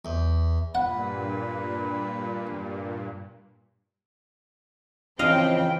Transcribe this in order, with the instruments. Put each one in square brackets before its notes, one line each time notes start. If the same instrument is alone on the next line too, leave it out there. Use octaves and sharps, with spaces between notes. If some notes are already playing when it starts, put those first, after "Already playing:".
[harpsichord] E2
[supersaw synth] G2 A#2 [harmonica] B4 [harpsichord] F#5
[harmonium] C#3 F3 [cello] E3 G5 [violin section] C4 [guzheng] D#5 F5